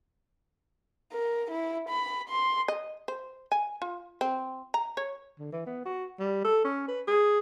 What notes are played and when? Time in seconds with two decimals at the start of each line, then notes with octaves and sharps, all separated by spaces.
1.12 A#4
1.50 E4
1.89 B5
2.29 C6
2.68 D#5
3.08 C5
3.52 G#5
3.82 F4
4.21 C4
4.74 A#5
4.97 C#5
5.39 D3
5.53 E3
5.67 B3
5.85 F#4
6.20 G3
6.45 A4
6.65 C#4
6.88 B4
7.08 G#4